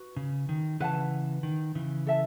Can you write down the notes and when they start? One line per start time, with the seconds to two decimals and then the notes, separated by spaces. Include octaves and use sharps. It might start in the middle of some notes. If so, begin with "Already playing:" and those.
Already playing: F#4 B4
0.17 C#3
0.49 D#3
0.80 C#3 E3 B4 F#5 A5
1.43 D#3
1.75 C#3 E3
2.07 A4 E5 A5